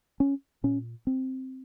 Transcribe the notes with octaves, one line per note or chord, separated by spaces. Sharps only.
C#4
A#2 C#4
C4